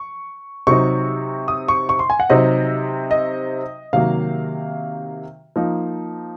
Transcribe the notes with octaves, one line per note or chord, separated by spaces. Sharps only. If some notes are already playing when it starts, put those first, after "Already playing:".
Already playing: C#6
C3 F#3 C4 D#4 C#6
D#6
C#6
C#6
C6
G#5
F#5
C3 F#3 C4 D#4 D#5
D#5
C3 D#3 F#3 A#3 F5
F3 A#3 D#4